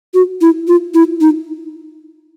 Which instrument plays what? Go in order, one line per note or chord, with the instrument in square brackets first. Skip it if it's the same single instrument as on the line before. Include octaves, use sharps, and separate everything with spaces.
[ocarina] F#4
E4
F4
E4
D#4